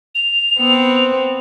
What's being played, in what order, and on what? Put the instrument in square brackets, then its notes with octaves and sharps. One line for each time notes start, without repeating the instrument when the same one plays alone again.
[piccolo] F7
[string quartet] B3 C4